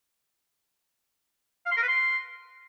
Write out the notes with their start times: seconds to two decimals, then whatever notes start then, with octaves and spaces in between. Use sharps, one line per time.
1.66 F5
1.71 C6
1.77 A#4
1.82 B4
1.88 C6